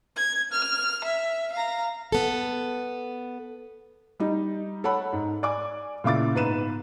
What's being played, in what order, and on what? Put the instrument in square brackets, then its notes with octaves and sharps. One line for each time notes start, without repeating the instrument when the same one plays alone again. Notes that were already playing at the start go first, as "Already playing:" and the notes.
[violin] G#6
F6
E5
F5 A#5
[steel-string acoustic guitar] B3 A4
[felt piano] G3 D#4
A4 C#5 F#5 B5
G#2
D5 G#5 D6
A#2 C#3 E4 D6 A6
G#2 B3 B4 D#7 E7